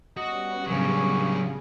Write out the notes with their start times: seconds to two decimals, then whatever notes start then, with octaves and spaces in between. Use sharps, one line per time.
0.17 G3 B3 C#4 F#4 D#5
0.68 A2 C#3 F#3 D4 C#6